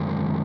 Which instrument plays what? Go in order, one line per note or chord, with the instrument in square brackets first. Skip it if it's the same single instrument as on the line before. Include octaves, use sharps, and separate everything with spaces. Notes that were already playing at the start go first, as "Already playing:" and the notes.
Already playing: [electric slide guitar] F#2 D#3 G#3